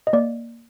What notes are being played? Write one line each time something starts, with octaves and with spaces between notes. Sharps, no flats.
D#5
A#3 D5